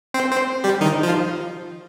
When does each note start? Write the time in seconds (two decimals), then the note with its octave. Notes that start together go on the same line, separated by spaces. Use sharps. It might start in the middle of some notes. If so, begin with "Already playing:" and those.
0.14 C4 C5
0.31 C4 C5
0.64 G3 G4
0.81 D#3 D#4
1.03 F3 F4